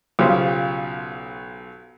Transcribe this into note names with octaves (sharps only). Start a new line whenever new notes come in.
B1 C#3 F4 G4 C5 F5